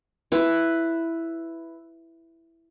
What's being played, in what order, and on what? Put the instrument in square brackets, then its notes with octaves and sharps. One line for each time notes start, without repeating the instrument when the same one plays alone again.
[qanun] E4 B4